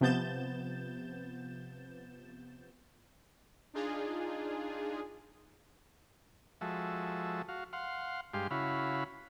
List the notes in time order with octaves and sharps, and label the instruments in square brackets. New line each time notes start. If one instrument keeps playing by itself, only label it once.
[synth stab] C3 F3 B3 G6 A6 E7
[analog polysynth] D4 D#4 F4 G#4
[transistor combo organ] F3 G#3 F#4 A4 E5
F#4 F5
F5 F#5 C6
G2 G#3 G4 F5 C6
C#3 E4 F#4 F5 B5